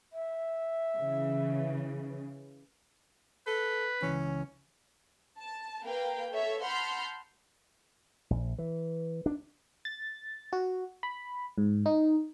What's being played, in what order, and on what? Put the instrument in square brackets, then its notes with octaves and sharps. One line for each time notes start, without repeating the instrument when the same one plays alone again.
[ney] E5
[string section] C#3 E3
[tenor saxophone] A4 [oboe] B4
[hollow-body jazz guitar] C#2 G2 E3 [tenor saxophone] C#4
[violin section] A5
A#3 A#4 B4 F5 G5
A4 C#5 E5
F#5 A5 B5 C6 F6 G6
[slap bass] A#1
E3
D4
[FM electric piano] A6
F#4
B5
G#2
D#4